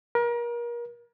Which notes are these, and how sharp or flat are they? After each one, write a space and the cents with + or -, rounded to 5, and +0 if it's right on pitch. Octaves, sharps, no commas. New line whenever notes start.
A#4 +35